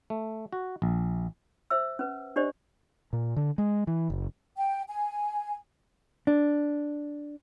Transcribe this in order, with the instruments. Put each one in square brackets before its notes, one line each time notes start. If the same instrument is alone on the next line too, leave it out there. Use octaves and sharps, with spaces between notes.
[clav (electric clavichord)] A3
F#4
A#1
[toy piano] C5 E5 E6
C#4 B4
D4 G4 C5 D5 D#5
[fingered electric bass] A#2
D3
G#3
E3
F#1
[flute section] G5
G#5
[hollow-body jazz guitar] D4